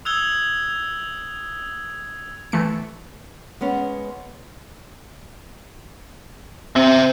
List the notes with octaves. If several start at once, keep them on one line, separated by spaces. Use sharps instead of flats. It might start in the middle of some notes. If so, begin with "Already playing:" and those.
D#6 E6 F#6 G#6 F7 G7
E3 A3 C#7
G#3 B3 C#4
C4 C5 E5